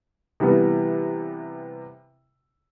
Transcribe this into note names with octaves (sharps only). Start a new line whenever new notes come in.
C3 E3 G3 B3